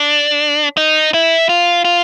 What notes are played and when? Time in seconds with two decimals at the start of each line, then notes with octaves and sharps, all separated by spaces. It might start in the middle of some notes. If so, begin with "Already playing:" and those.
Already playing: D4
0.77 D#4
1.14 E4
1.49 F4
1.85 F4